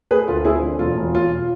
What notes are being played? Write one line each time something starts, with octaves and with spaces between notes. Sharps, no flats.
A3 G#4 B4
D2 F4
C4 E4 G#4
D3
E1 F4
E1
E1 F4